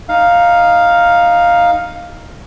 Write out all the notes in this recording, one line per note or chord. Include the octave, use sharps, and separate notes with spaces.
D#4 F5